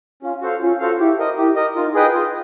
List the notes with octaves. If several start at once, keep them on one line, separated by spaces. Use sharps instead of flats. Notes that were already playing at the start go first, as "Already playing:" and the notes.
C#4 F4
F#4 A4 C5 F5
C#4 F4
F#4 A4 C5 F5
E4 G4
A#4 D#5
E4 G4
A#4 D#5
D#4 F4
G#4 B4 D#5 G5
F4